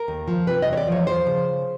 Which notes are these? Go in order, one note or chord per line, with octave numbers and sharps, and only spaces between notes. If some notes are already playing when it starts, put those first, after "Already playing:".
Already playing: A#4
D#2
F3
C3 B4
D#5
E2 C#5
D5
F3 C#5
F3 C5
C#3